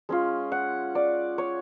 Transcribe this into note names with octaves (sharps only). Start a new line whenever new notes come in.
G#3 C#4 F4
F#5
D5
C#5